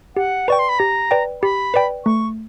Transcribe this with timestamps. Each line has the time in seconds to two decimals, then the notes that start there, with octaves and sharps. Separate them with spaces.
0.16 G4 F#5
0.48 B4 D5 G5 C#6
0.59 C6
0.69 B5
0.79 G4 A#5
1.11 B4 D5 G5
1.42 G4 B5
1.74 B4 D5 G5
2.05 A3 C#6